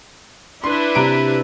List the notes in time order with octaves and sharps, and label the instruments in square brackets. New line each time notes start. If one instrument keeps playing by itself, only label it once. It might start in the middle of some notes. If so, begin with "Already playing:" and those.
[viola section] D4 E4 B4 [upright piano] C6
[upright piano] C3 A#5 D7 [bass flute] G4